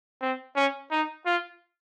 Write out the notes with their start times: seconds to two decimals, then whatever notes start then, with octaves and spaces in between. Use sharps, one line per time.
0.21 C4
0.56 C#4
0.91 D#4
1.26 F4